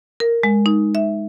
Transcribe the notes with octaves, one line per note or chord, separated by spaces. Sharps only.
A#4
G#3
D#4
E5